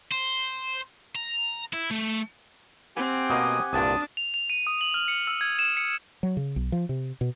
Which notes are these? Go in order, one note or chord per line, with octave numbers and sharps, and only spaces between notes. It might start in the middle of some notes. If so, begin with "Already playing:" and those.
C5
A#5
E4
A3
C4 G4 F#5 G#5
B2 A#3 D#5 D#6
C2 G2 A#2 D4 A5 D#6
F7
F7
D#7
D#6
F#7
F6
C#7
E6
G#6
E7
C#7
F#3
C#3
B1
F3
C3
B2